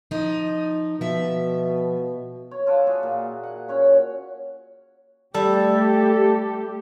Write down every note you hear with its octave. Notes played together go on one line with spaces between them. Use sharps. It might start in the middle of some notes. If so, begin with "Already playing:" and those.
F3 D#4
B2 F3 E5
C#5
F4 A4 D5 F#5
F#4 G#4 E5
A#2
F#5
C#4 C#5 F#5
G3 A3 G4 A4